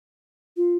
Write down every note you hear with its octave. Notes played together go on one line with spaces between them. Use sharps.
F4